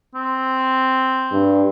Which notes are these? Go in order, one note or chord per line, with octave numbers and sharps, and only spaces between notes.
C4
G2